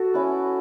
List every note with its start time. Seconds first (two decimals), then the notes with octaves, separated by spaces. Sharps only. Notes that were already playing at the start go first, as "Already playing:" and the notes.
Already playing: F#4 A4
0.14 C#4 E4 B4